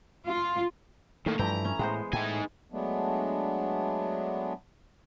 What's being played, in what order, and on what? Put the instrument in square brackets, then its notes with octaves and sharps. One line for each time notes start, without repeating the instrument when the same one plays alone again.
[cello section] F4
[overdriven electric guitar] A2 A#3 [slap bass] D#3 [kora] A3
[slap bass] G2 F3 [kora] E3 E4 G5 [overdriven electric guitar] A#5
[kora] C#4
[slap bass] A2 [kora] G#3 B3 C5
[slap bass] A2 [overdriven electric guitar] D#4 G#5
[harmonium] F#3 G#3 A3 B3 D4